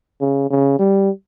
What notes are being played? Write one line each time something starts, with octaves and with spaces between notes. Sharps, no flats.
C#3
C#3
G3